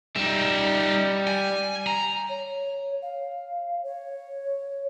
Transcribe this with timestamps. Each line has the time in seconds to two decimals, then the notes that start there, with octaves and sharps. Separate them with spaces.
0.16 G3 D#4 E5
1.27 G#5
1.87 A#5
2.29 C#5
3.02 F5
3.84 C#5